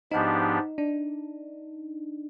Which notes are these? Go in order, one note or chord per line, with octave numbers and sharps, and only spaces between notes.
G#2 F3 B3 D4 D#4 G4
D4